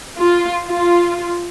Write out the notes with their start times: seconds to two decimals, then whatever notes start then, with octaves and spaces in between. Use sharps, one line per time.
0.17 F4
0.67 F4